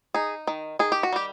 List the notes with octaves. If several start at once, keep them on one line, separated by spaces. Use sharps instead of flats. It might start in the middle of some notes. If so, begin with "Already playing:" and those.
D#4 G#4
D#3
D#3 G#4
G4
F#4
G3 G4